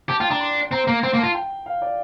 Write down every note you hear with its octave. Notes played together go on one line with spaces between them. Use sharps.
G4 A5
F4 G5
D4 A#5
C6
C4 A#5
A#3 A#5
C4 C6
A#3
A5
F4
G5
F5
D5